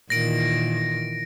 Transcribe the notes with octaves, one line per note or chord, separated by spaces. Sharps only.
A#2 D#3 E3 A#6 D7